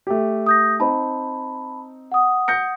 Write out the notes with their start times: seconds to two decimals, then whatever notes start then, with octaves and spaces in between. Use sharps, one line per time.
0.07 A3 G4
0.46 D#6 G6 A#6
0.80 C4 D#4 A5 B5
2.12 F#5 D#6
2.48 G6 A#6 C#7